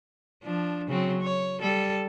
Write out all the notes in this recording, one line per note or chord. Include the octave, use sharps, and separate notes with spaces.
F3 D4
C#3 F#3 C4
C#5
G3 A4